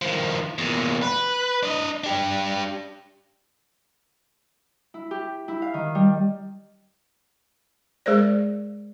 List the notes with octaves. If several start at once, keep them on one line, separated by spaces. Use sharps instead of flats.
D#3 F3
E2 A#2
B4
D4 D#5
D4 G4
E4
G4
E4
F5
D#3
G3
G#3 G#4 A#4 C5 D5